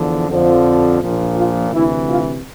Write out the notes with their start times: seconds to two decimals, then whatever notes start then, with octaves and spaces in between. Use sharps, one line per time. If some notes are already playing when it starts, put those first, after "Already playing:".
Already playing: E2 D3 F3
0.28 F2 D3 F3
1.00 A#1 A#2 F3
1.36 F4
1.72 D2 C3 E3 E4
2.07 F4